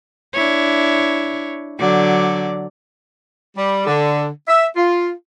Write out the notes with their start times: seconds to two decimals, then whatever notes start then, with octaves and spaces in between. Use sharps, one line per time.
0.34 D4 E4 C#5
1.78 D3 F#3 D5
3.57 G3
3.87 D3
4.48 E5
4.76 F4